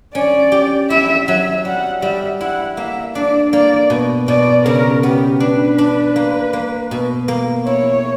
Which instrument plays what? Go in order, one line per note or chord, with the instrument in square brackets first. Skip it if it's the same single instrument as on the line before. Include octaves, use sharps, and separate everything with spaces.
[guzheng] C#4 [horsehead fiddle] D5
[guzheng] G4
[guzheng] E4 [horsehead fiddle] E5
[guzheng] F#3 [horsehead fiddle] E5
[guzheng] G3 [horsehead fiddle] F#5
[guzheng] G3 [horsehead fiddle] E5
[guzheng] E4 [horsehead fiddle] F#5
[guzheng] A#3 [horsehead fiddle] E5
[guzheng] D4 [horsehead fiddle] D5
[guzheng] A#3 [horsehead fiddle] D5
[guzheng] B2
[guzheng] B2 [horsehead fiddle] D5
[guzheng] C#3 [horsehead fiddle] A#4
[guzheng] B3 [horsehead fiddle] G4
[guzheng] D4 [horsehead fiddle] B4
[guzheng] D4
A#3
A#3
B2
A#3
[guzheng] E4 [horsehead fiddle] C#5